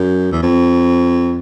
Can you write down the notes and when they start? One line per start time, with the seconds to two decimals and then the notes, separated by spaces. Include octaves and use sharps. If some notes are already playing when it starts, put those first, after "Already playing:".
Already playing: F#2
0.32 E2
0.42 F2